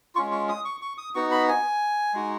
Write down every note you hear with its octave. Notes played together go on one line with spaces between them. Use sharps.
G#3 C#4 F4 C#6
C#6
D#6
C#6
C#6
D#6
B3 D#4 F#4 C#6
B5
G#5
G#3 D#4 F#4